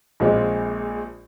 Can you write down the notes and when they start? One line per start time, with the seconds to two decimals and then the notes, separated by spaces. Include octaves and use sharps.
0.20 A#1 A#2 G#3 C4 F4